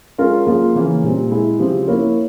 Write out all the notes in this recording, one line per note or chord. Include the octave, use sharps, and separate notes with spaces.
G#3 C#4 F4 A#4
F3 A#3 F4 G#4
C#3 E3 A#3 C#4
A#2 G3 C4
G#3 E4 G#4
C#3 F3 C4 G4
A#3 E4 A#4 C#5